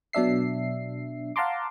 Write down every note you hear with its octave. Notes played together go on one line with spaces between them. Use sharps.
B2 F#3 D4 E5 C7
F5 F#5 A5 A#5 C6 D6